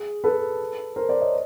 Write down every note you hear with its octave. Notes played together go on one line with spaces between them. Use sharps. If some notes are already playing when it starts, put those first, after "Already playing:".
Already playing: G#4
A4 B4
A#4 C5
C5 D5
C#5 D#5